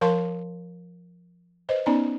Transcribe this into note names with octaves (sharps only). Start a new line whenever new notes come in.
F3 A#4 F5 A5 C6 C#6
B4 C5 D#5
B3 C#4 D#4 D5 A#5